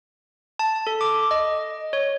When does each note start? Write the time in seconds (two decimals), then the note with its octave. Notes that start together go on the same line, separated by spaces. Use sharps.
0.59 A5
0.87 A4
1.01 D6
1.31 D#5
1.93 C#5